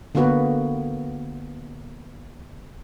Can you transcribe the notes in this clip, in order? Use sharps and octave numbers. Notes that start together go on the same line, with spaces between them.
D3 A#3 B3 F#4 B4